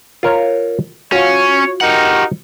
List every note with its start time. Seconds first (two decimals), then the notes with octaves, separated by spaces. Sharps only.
0.23 F4 A#4 C#5
1.12 C#4 F4 F#4 C#5
1.81 D#4 G4 A#4 F#5